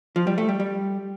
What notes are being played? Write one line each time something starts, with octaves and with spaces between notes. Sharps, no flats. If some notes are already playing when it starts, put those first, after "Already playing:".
F3
G3
A3
G3
G3